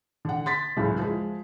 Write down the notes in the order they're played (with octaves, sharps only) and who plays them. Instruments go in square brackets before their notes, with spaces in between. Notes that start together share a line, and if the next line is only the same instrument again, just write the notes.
[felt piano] D3 F#5
C6 A6 B6
C#2 F#2 A2 C#3
F3 G#3